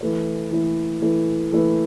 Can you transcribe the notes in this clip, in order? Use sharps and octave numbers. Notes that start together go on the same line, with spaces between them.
E3 A3 E4 B4
E3 A3 E4 B4
E3 A3 E4 B4
E3 A3 E4 B4